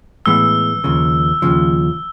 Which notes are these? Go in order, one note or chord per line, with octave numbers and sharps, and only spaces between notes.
A2 E3 G#3 B3 E6
D#2 C#3 F3
D#2 C#3 F3